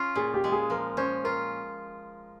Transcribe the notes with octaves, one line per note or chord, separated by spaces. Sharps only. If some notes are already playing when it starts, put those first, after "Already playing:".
Already playing: C#4 F4
A#2 G#4
G4
G#3
G#4
F3 A#4
C#4 C5
F4 A#4